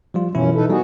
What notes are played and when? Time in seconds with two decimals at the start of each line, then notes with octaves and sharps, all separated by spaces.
0.14 F3 G3 F4
0.35 F#2 B2 E3 C#4 E4
0.55 D#4 A4 B4
0.70 G3 B3 D#4 F#4 G#4